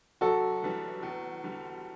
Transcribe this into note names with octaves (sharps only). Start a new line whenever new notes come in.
F#2 F#4 A4
E3 G3 D4
E2
D3 G3